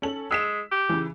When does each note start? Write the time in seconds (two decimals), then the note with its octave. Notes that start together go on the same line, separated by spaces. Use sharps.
0.02 C#4 A4 F#7
0.31 G#3 E6 B6 E7
0.71 G4
0.89 C#3 E3